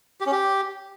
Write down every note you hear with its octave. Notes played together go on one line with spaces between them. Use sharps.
G4
C#4
G4